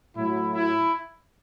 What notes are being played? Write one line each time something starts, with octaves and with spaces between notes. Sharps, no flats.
A2 F#3 E4
E4